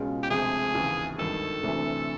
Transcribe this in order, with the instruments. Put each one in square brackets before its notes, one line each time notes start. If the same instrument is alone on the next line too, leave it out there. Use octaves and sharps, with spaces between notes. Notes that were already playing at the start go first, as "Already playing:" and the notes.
Already playing: [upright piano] C#2 B2 G#3 C#4 F4
[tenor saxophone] G4
[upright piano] D2 C3 F3 G#3 C4 [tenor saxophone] G#4
[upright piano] D#2 C#3 E3
[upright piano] G#1 G2 D#3 [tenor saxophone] A4
[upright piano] D2 C3 E3 A3 D4